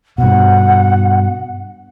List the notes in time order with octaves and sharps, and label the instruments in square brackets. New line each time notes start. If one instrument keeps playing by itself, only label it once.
[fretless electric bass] G2 B2 [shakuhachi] F#5